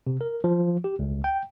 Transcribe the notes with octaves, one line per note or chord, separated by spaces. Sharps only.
C3
A#4
F3
G4
C#2
G5